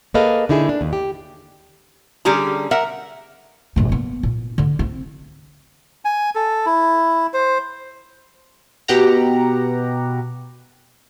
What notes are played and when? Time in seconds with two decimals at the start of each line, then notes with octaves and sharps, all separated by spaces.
0.14 A#3 G#4 A4 B4 D#5 F5
0.49 D3 D#4 E4 G#4
0.69 D4
0.81 D#2
0.93 G4
2.25 D3 G3 C#4 G4 G#4 A#5
2.71 A#4 E5 F#5
3.76 A#1 F#2
3.89 A#3 B3
4.23 A#2
4.58 D3
4.79 C4
6.05 G#5
6.35 A4
6.66 E4
7.34 C5
8.88 B2 G4 F#5 A#5